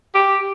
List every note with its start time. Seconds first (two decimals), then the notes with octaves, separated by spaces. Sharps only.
0.14 G4